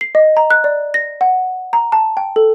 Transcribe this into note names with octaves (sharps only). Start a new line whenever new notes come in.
C7
D#5
A#5
F#6
D5
A#6
F#5
A#5
A5
G5
A4